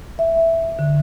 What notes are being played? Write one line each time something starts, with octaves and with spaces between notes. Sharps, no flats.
E5
D3